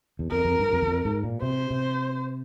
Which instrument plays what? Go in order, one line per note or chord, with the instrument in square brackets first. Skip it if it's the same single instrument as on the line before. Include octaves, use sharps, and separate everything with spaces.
[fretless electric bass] E2
[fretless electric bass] F2 [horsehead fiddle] A#4
[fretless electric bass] F2
G2
F2
E2
F2
G#2
A#2
[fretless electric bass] C3 [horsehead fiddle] C5
[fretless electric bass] C3